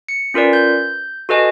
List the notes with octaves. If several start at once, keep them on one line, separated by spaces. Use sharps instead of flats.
C#7
C#4 F4 A#4 B4 D5
G6
F#4 A4 B4 D#5 G#5